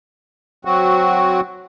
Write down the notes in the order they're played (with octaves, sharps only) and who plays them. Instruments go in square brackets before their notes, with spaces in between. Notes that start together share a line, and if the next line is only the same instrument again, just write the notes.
[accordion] F#3 C4 F#4